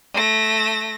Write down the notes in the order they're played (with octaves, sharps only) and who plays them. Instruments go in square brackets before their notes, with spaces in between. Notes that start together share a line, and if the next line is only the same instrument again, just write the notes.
[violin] A3 A#6